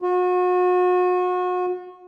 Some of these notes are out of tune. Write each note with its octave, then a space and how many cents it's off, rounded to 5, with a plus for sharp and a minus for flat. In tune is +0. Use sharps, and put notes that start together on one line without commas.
F#4 -35